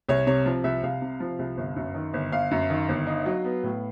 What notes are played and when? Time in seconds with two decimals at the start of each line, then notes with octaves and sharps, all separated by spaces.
0.09 C2 C#5
0.27 C3 C#5
0.46 F3
0.64 C2 E5
0.83 C2 F5
1.02 C3
1.20 F3
1.39 C2
1.57 G1
1.76 F#2
1.94 D#3
2.13 G1
2.32 G1 F5
2.51 F#2
2.70 D#3
2.89 G1
3.07 D#4
3.26 F#3
3.44 B3
3.63 A2